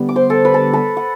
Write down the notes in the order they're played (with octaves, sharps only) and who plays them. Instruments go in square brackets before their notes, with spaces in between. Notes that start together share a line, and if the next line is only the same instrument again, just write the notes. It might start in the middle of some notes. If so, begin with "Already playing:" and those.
Already playing: [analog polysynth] D3 G3 B3
[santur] D6
C5 C6
A4 A5
B4 B5
A4 A5
A4 A5
F#5